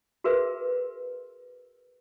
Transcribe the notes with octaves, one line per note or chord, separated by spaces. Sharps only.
F#4 G#4 A#4 B4 E5